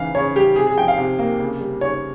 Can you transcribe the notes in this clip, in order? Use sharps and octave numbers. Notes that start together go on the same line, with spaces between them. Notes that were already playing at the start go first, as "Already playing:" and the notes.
Already playing: C#3 E3 F5
C#3 C#5
G3 G4
C3 G#4
G#4
F3 G5
F5
C3
A#3
C#3
G3
C#3 C#5